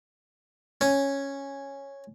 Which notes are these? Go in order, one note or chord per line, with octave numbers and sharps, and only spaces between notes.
C#4